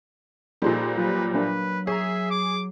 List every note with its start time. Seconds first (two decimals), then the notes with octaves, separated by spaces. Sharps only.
0.62 A#2 F3 G3 D#4 G#4 A4 C6
0.97 F#3 F4 B4
1.34 A#3 D4 A#4 B4
1.87 G#4 C#5 E5 A#5
2.31 D6